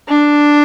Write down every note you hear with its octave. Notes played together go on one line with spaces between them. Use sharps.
D4